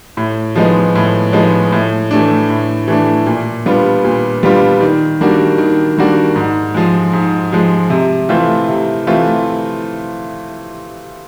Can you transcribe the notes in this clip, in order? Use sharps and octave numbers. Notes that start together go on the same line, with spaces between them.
A2
F3 G#3 B3 D#4
A2
F3 G#3 B3 D#4
A2
E3 A3 D4
A2
E3 A3 D4
A#2
G3 B3 D4 F4
A#2
G3 B3 D4 F4
D#3
G3 A#3 D4 F#4
D#3
G3 A#3 D4 F#4
G#2
F3 G#3
G#2
F3 G#3
C3
E3 A3 C4 F4
C3
E3 A3 C4 F4